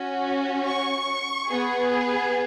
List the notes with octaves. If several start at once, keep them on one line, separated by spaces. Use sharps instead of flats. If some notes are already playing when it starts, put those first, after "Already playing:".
Already playing: C#4 F#4
C#6
B3 G#4